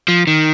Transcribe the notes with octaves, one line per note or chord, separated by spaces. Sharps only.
F3
D#3